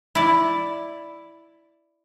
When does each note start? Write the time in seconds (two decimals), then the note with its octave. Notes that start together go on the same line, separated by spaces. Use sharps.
0.15 E4 D5